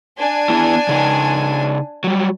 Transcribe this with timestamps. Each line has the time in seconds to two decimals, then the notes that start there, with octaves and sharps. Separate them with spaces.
0.17 D4 G#5
0.50 B3 E4
0.89 C#3 D#4
2.04 F#3 G3